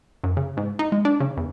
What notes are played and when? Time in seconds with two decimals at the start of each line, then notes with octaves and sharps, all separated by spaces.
0.24 F#2
0.37 C#3
0.57 G#2
0.79 D#4
0.92 G#3
1.05 D4
1.20 C#3
1.37 E2